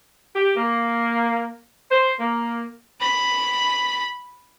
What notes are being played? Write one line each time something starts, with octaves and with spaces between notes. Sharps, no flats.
G4
A#3
C5
A#3
B5 B6